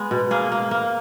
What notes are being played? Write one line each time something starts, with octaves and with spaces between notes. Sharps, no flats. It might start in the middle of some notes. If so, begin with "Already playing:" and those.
Already playing: G#3 B3
B2
A#3 G#4
A#3
A#3